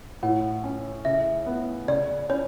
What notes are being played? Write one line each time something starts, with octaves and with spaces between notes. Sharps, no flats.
A2 F#5
C#4
C#3 E5
B3
C#3 D5
C#4 C#5